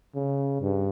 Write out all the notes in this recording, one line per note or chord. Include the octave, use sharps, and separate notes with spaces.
C#3
G2